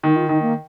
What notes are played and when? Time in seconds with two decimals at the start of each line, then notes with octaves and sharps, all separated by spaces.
0.03 D#3 D#4
0.16 F4
0.29 D#3 D#4
0.42 A#3